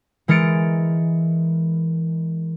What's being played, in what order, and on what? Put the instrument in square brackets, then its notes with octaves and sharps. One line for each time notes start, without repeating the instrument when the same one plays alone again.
[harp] E3 G#3 A#4 A6 C#7 D7